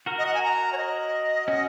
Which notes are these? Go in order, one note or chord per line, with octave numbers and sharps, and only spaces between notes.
F#4 A#4
D#5
F#5
G#5
A#5
C#5
D#5
C#4 F#4